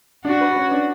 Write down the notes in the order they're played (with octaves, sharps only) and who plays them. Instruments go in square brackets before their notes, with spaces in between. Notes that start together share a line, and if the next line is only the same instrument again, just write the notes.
[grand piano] D4 [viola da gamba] F#4
[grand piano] B4
C#4
D4